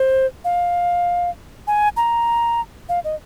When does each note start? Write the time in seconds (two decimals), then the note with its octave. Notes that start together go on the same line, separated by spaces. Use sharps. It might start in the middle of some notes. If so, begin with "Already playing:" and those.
Already playing: C5
0.44 F5
1.67 G#5
1.97 A#5
2.89 F5
3.04 D#5